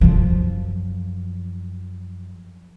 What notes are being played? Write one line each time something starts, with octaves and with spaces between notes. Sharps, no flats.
F#2 F3